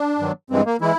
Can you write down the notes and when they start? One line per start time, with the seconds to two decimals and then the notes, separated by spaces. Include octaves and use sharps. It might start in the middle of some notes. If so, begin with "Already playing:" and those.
Already playing: D4
0.19 G2 D#3 F#3
0.50 G2 E3 G#3 C4
0.66 A#3
0.81 E3 G#3 E4